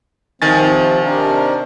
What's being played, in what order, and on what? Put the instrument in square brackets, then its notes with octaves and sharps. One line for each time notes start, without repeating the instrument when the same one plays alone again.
[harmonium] C3 F3 C4 [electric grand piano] D#3 G#5 A6
[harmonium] C3 D4 A#4